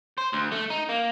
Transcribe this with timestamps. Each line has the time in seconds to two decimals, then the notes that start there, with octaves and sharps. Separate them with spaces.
0.18 C5
0.33 D2
0.52 A3
0.70 D#4
0.89 A#3